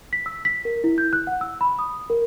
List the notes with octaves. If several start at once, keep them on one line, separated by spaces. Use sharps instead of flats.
B6
E6
B6
A#4
E4
G6
F#6
F#5
E6
B5
D#6
A#4